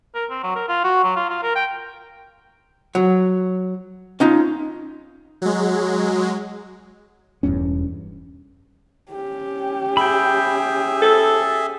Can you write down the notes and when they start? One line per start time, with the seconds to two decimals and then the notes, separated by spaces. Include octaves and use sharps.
0.15 A#4
0.30 C4
0.43 F#3
0.56 A#4
0.68 F4
0.84 F#4
1.04 F#3
1.16 F4
1.30 F4
1.43 A#4
1.56 G5
2.95 F#3
4.20 C#4 D#4 F4
5.42 F#3 G#3
7.43 E1 E2 G2 C#4
9.11 C#4 G4
9.97 G#4 E5 G5 B5
11.02 A4